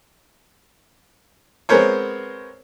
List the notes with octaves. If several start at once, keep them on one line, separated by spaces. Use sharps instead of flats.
G#3 B3 C4 A#4 C5 C#5